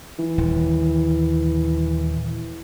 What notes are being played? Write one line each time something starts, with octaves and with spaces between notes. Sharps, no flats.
E3
D#1